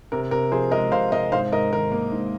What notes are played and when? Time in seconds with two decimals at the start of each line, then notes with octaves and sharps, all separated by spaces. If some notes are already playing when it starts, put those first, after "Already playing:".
0.12 C3 A#4
0.31 C3 A#4
0.52 F3 G#4 C5
0.71 G#3 A#4 D#5
0.92 C3 C5 F5
1.12 C3 A#4 D#5
1.32 G#2 C5 F5
1.52 G#2 A#4 D#5
1.72 D#3 A#4
1.92 A#3
2.12 G#2